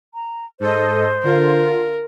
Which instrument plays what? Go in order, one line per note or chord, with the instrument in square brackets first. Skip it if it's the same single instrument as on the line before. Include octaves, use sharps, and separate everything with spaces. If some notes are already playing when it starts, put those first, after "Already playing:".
[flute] A#5
[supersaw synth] G#2 A4 D#5 [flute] C5
[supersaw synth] D3 F4 [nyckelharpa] A#4